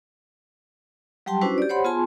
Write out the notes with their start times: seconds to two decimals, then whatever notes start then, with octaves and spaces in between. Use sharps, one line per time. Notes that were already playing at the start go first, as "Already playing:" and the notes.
1.26 F#3 G3 G4 G5 A5 C6
1.41 C#4 D4 E4 F#4 B4 C5
1.58 G4 D5
1.69 C5 C#5 F#5 B5 C6
1.84 B3 F4 G#4 G#5 A5 C6